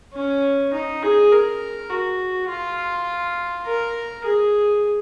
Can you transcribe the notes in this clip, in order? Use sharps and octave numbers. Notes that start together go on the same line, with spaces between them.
C#4
D#4
G#4
A#4
F#4
F4
A#4
G#4